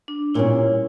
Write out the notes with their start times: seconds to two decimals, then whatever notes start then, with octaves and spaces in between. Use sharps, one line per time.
0.08 D4
0.35 A#2 G3 C#4 E4